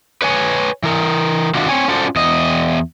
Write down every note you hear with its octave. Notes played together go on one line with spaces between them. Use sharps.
B4 C#5 G#5
E3 A#4
C3 D#3 D4 F4 F#4
C4 C#5 G#5
C#4 F4 F#4 A4 C5 D5
E2 D#5